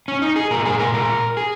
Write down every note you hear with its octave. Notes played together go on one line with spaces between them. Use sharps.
C#4
D#4
G#4
A#2 G#3 A#4
G#4
A#4
A#4
G#4